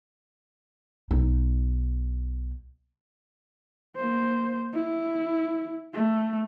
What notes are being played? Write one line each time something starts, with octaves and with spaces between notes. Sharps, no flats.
B1 D#4
A#3 C5
E4
A3